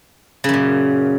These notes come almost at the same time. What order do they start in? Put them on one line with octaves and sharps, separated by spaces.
C#3 F#2 A#2